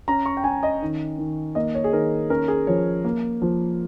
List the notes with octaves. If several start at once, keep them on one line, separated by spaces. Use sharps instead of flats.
C#4 A#5
C#6
G5
C#4 G#5
D#5
D#3
D#3
A#3 D#5
C#5
G#4
D#3 A#4
C#4 A#4
G#4
F3 C#5
A#3
F3